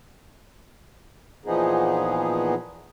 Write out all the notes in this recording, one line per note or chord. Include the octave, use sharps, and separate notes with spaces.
A#2 E3 F3 B3 D#4 G#4